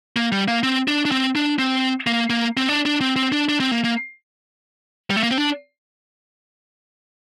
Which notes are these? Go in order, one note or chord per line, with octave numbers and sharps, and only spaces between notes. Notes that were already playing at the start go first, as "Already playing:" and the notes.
A#3
G3
A#3
C4
D4
D4
C4
D4
C4
A#3
A#3
C4
D4
D4
C4
C4
D4
D4
C4
A#3
A#3
G3
A3
A#3
C4
D4